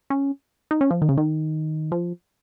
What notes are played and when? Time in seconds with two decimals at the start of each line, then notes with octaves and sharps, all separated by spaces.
0.10 C#4
0.71 D#4
0.81 C#4
0.90 F3
1.02 D#3
1.09 C#3
1.17 D#3
1.92 F3